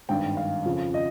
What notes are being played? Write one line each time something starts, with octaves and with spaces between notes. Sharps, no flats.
G#1 G2 D#3 G5
F5
F2 C#3 F3
D#5